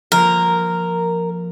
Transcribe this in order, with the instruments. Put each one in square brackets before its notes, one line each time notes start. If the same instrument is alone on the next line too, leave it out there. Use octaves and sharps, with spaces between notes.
[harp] F3 A#3 [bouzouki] A#4